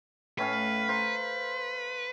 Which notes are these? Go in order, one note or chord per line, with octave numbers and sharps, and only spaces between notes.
A2 C#4 B4 F5
C5 F5 A#5